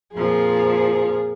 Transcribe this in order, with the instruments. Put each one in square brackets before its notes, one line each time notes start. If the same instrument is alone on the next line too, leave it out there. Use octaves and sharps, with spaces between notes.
[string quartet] F2 A#2 F3 [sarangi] G#4